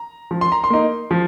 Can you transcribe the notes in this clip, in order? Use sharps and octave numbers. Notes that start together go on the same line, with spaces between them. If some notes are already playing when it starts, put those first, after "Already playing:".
Already playing: A#5
F3
C6
A#5
C6
A#3 D#4
F3